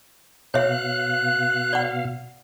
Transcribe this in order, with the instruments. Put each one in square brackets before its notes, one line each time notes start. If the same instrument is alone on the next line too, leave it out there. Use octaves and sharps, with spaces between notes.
[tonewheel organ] B2 F5 [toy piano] C#5 E5 [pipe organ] F#6
[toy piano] D5 F#5